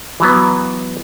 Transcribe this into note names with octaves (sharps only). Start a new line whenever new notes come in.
E3 F#3 B3